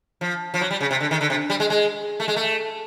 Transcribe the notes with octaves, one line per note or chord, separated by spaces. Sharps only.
F3
F3
F#3
G3
C#3
C3
D3
D#3
D3
C3
G3
G#3
G#3
A3
G#3
A3